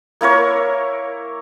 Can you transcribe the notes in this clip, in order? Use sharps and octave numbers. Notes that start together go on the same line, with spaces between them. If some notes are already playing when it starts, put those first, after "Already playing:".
A#3 E4 A#4 C#5